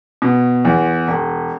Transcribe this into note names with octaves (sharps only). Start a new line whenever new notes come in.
B2
E2
E1